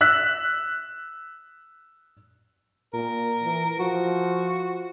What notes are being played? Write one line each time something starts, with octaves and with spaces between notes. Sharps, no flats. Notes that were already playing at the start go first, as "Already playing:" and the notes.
E6 F#6 B6
A#2 A#4
E3
F3 F#4